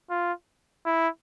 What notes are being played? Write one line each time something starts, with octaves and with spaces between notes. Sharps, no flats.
F4
E4